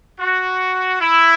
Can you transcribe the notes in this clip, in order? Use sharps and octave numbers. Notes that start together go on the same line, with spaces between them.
F#4
E4